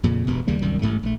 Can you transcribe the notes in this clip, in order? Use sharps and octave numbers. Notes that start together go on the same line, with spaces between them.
F2 A#2 C#3
E1 G2 B2
D#2 C#3 G3 A#3
C2 F#2 D#3 G3
A1 G#2 A3
A#1 A3